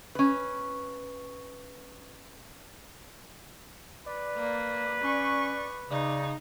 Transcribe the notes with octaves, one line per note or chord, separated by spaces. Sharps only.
C#4 B4
B4 D5
A#3
C#4 C#6
C#3 D#4 D5